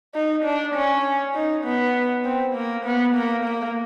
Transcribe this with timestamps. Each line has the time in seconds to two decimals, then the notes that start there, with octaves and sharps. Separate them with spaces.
0.15 D#4
0.44 D4
0.74 C#4
1.35 D#4
1.64 B3
2.25 C4
2.54 A#3
2.85 B3
3.15 A#3
3.44 A#3